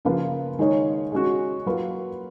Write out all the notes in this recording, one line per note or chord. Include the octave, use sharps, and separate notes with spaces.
C#3 F3 A#3 F4 B4
D#3 G#3 D#4 G#4 C#5
G#3 C#4 F#4
F#3 A#3 F4 B4